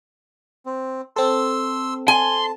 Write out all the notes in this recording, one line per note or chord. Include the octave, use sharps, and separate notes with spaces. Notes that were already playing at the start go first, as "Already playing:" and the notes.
C4
C4 A4 C6 E6
G#5 A5 C6